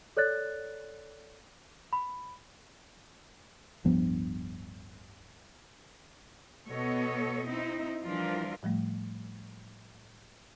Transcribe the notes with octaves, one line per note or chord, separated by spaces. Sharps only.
A4 C#5 D5 F#6 A6
B5
D1 G2 F3 B3
B2 B3 A4 C#5 D#5
C4 D#4 E4
E3 F3 G3 D4 F4 A#4
A2 F3 G3 A3